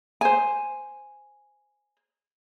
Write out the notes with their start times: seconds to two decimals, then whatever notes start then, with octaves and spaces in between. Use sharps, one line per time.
0.21 C5 G#5